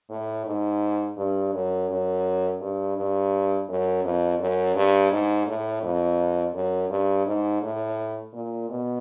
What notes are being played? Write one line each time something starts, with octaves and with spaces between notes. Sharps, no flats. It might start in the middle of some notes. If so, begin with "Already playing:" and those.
A2
G#2
G2
F#2
F#2
G2
G2
F#2
F2
F#2
G2
G#2
A2
F2
F#2
G2
G#2
A2
A#2
B2